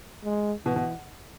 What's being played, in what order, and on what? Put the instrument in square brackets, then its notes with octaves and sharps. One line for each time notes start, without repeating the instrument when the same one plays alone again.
[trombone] G#3
[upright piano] B2 [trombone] E3
[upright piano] B2